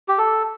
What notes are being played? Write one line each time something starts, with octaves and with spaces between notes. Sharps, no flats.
G4
A4